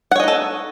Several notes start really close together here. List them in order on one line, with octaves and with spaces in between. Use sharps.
F#5 C#5 D#5 D#4 A4